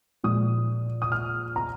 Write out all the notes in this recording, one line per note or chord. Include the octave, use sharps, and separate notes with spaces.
A#2 F3 G#3 D#6
D#6
F6
A#5